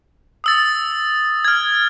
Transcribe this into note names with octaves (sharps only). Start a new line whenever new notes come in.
D#6 E6 A6
F6 G#6